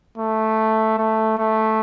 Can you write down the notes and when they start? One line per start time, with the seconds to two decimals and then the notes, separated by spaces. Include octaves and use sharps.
0.18 A3
0.98 A3
1.38 A3